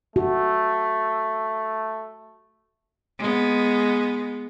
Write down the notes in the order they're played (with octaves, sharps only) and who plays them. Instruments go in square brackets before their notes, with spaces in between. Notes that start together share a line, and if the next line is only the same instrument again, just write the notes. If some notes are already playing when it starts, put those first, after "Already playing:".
[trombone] A3 [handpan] F#4
[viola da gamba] G#3 B3